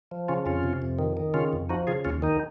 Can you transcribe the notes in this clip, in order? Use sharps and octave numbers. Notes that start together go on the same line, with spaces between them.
F3
C#3 C#4 F4
F2 C#4 F4
C3
F2
D#3
D#3
C#3 C#4 F4
F2
F3 D#4 F#4
C#3 F4 G#4
D#2 C#4 F4
D#3 D#4